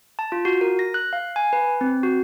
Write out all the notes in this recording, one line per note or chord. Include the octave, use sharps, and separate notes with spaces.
A5
F4
F#4
A#4
A#6
F#6
F5
G#5
B4
C4
F#4